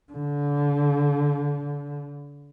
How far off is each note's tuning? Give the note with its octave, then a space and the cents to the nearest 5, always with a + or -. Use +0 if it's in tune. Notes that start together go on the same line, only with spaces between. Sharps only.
D3 -30